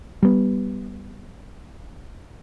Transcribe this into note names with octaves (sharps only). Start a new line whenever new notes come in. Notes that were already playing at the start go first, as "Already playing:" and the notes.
G3 B3